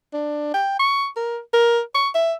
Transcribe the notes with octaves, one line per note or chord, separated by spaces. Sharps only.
D4
G5
C#6
A#4
A#4
C#6
E5